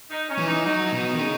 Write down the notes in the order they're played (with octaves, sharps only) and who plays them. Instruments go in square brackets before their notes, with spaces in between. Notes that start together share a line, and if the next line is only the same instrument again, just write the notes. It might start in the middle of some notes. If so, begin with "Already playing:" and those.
[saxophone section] D#4
C#4
[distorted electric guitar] E3
[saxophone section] D#4
[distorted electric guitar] F#3 [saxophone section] D#4
[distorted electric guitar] B2
D#3
C#3